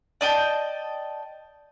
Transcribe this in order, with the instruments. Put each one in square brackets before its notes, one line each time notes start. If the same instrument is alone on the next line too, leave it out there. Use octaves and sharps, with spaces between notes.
[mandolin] D5 D#5 G5 A5